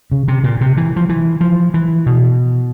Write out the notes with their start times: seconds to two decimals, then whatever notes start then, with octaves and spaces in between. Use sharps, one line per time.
0.12 C#3
0.28 C3
0.44 A#2
0.61 C3
0.77 E3
0.96 F3
1.09 E3
1.41 F3
1.74 E3
2.06 B2